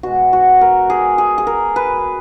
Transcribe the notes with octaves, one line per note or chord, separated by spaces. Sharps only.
B2 G#3 F#4
F#4
A#4
G#4
G#4
G#4
A#4
B4